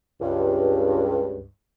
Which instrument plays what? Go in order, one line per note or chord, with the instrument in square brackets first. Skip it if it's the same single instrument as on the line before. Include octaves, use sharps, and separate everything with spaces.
[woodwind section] C#2 G2